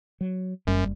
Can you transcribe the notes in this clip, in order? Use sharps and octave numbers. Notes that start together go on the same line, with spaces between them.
F#3
F#1 F#2 G3